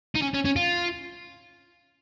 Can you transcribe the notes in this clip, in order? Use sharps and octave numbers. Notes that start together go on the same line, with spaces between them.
D#4
C#4
C#4
C#4
F4